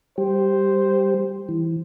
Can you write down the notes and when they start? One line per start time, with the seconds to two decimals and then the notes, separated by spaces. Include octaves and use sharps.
0.18 G3 G4 C5
1.49 E3